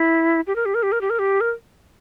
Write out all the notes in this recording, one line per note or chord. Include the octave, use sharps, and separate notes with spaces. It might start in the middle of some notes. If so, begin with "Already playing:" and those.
Already playing: E4
G4
A#4
G4
A#4
G4
A#4
G4
A#4
G4
A#4